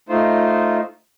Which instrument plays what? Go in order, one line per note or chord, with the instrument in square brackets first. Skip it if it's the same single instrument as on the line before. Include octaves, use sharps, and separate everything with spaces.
[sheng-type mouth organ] A3 D#4 F4 C5